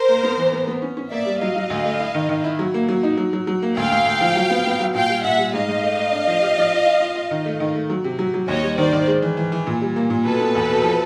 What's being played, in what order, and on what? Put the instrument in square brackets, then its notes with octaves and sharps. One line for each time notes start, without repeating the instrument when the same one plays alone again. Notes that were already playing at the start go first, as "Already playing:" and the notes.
Already playing: [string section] A#4 C5
[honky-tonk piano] A#3
B3
E3
B3
B3
C#4
C#4
[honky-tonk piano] A#3 [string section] D5 E5
[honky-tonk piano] G3
[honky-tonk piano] F#3 [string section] D#5 F5
[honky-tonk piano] F#3
D2
A3
E4
D#3
D#3
E4
F#3
A#3
F#3
D#4
F#3
F#3
F#3
A#3
[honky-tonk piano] D2 [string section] F5 G5
[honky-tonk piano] D2
D2
F3
F#3
B3
B3
F#3
[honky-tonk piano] A#2 [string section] F5 G5
[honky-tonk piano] G3
[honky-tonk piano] A#2 [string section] E5 F#5
[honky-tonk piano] G3
[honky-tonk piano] G#2 [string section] D#5 F5
[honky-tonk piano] G#2
A3
A3
D4
F3
G4
F3
F4
F4
F4
F4
D#3
A3
D#3
A3
F#3
C3
F#3
F#3
[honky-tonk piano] D#2 [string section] C#5 D#5
[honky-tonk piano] G3
[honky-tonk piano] D#3 [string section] C5 D5
[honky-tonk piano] D#3
G#3
E3
E3
E3
A#2
G3
A#3
A#2
[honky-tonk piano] B2 [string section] A4 B4
[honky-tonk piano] B3
E2
B2
F3